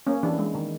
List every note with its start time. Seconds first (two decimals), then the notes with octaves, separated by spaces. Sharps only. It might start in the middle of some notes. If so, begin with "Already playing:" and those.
0.07 A#3 C#4
0.23 E3 D4
0.39 G#3
0.55 D#3